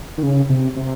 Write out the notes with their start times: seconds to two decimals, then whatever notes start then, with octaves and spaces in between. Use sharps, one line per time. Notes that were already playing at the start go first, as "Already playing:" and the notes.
0.18 D#3
0.23 C#3
0.50 C3
0.76 C3